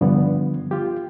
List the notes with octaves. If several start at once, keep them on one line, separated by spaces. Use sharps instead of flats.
G2 D3 F3 B3
F4 G4